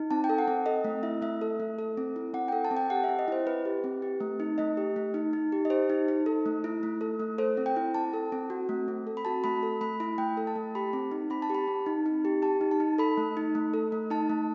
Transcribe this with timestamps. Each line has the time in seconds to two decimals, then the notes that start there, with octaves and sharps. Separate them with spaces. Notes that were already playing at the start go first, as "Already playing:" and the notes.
Already playing: D#4
0.11 C4 A5
0.24 G5
0.29 A4
0.38 F#5
0.48 C4
0.66 A4 D#5
0.84 A3
1.03 E4 E5
1.22 A3 E5
1.41 A4
1.60 A3
1.79 A4
1.98 C4
2.16 E4
2.34 C4 F#5
2.48 G5
2.52 A4
2.65 A5
2.71 C4
2.77 G5
2.90 G4 F#5
3.04 E5
3.08 C4
3.19 D#5
3.28 E4 C5
3.46 C4 B4
3.65 G4
3.84 C4
4.02 G4
4.20 A3
4.40 D#4
4.58 A3 D#5
4.77 G4
4.96 A3
5.14 D#4
5.33 D#4
5.52 G4
5.65 D#5
5.70 G4 C5
5.90 D#4
6.08 D#4
6.26 A4
6.46 A3
6.64 E4
6.83 A3
7.01 A4
7.20 A3
7.38 A4 C5
7.57 C4
7.66 G5
7.77 E4
7.95 C4 A5
8.13 A4
8.32 C4
8.50 F#4
8.69 A3
8.88 C4
9.07 A4
9.17 B5
9.25 F#4 A5
9.44 A3 B5
9.63 A4
9.81 A3 B5
10.00 E4 B5
10.18 A3 G5
10.37 A4
10.47 A5
10.56 A3
10.75 G4 B5
10.93 C4
11.11 D#4
11.30 C4 B5
11.42 A5
11.50 G4 B5
11.68 C4
11.86 D#4
12.06 D#4
12.25 G4
12.42 G4 A5
12.61 D#4
12.71 A5
12.80 D#4
12.98 A4 B5
13.17 A3
13.37 D#4
13.55 A3
13.74 A4
13.92 A3
14.10 D#4 A5
14.30 A3